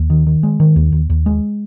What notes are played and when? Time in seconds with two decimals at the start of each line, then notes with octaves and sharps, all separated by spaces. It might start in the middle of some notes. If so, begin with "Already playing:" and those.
Already playing: D#2
0.10 D#3
0.27 D#3
0.43 G#3
0.60 D#3
0.76 D#2
0.92 D#2
1.10 D#2
1.26 G#3